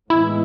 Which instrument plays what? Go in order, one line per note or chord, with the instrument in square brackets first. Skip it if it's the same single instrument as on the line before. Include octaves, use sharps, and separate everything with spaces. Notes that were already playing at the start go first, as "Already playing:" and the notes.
[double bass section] A2 E3 G#3 B3 [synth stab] E4